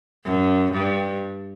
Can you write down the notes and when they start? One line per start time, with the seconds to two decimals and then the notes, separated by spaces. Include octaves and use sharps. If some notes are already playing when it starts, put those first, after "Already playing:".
0.25 F#2
0.72 G2